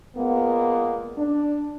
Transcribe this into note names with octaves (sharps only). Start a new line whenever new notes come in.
A#2 G#3 A#3 B3
D4